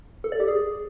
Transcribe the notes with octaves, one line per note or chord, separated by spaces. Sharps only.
A4
D5
G4
G#4